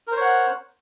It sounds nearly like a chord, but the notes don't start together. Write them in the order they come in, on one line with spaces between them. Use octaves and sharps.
A#4 C5 C#5 F#5